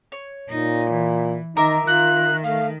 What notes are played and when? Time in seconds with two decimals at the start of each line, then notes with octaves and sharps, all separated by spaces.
0.12 C#5
0.50 A#2 D#4
0.91 E3
1.57 D#3 D#4 A#4 E5 D6
1.87 D#3 F4 F#6
2.44 A3 F5